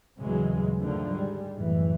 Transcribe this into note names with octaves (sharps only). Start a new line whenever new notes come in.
D#2 A#2 C#3 E3 F#3 G#3
G#2 D3 D#3 F3 A3
G3 G#3
F#1 C#2 A2 E3